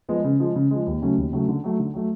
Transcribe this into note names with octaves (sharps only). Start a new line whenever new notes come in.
F3 G#3 B3
C#3
F3 G#3
C#3
F3 G#3
D#2
C#3 F#3 A3 C#4
D#2
C#3 F#3 A3 C#4
D3
F#3 A3
D3
F#3 A3